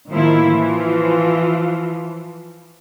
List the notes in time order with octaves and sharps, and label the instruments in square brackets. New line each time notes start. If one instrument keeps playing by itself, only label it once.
[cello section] A2 D#3 F3 A#3 E4 F4
E3 F3 F4